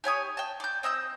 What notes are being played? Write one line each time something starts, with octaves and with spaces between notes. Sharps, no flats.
G4 C#5 G#5 D#6
G5 A5
D5 G6
C4 D#5 E6 G6